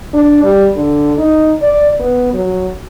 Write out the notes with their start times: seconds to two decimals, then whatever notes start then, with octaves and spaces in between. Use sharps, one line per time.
0.13 D4
0.44 G3
0.76 D3
1.18 D#4
1.62 D5
1.99 B3
2.33 F#3